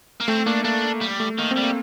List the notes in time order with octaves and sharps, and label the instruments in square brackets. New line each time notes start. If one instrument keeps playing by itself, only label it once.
[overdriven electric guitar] A#3
[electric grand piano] A3 [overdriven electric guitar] C4
[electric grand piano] A#3 [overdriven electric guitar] D4
[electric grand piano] A#3 [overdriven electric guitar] D4
[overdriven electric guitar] G3
[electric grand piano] A3
[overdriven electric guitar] D#3 [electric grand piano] A#3
[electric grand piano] C4
[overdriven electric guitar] G3
[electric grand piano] A#3